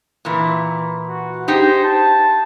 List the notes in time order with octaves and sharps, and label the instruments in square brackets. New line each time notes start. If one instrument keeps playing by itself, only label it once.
[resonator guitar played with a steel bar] A#2 E3
[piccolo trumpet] F#4
[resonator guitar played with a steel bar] D#4 G4 G#4 [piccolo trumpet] C5
[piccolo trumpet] A5